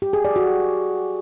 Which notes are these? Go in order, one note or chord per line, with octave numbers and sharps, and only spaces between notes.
G4
G#4
D5
F#4